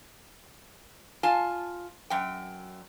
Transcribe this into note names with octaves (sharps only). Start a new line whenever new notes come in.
F4 G#5 A5
F#2 G5